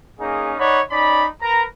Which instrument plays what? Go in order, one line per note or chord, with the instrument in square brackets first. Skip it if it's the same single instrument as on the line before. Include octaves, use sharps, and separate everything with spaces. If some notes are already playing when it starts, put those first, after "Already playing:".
[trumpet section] A#3 C#4 D#4 G#4
D#4 C#5 D5 F#5 B5
C#4 D#4 D5 B5
A#4 B4 A#5